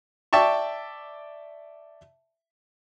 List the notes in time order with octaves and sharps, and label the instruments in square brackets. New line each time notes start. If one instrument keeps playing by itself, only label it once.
[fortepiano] D5 E5 G5 A5 C#6